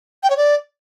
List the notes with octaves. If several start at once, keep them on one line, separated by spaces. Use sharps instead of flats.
G5
C#5
D5